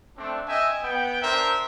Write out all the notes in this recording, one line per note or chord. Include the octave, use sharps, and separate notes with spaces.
A3 C4 D4
D#5 E5 G5 G#5
B3 G5
D4 A#4 C5 E5